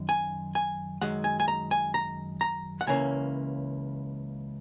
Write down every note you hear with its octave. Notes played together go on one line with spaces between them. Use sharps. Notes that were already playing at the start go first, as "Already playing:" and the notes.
Already playing: F#2 D#3
G#5
G#5
F#2 D#3 G#3 F#5
G#5
G#5
A#5
G#5
A#5
A#5
F#5
C#2 C#3 E3 A#3 C#4 G#5